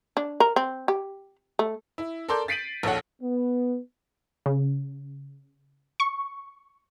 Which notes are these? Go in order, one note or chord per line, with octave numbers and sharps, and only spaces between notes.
D4
A#4
C4
G4
A3
E4
A4 A#4 D5 C6 D6 G6
A6 B6 C7 D7 D#7 F#7
A#1 D#2 A4 C#5 F#5
B3
C#3
C#6